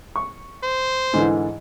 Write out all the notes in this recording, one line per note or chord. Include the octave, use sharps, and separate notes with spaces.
C#6
C5
G#2 D3 E3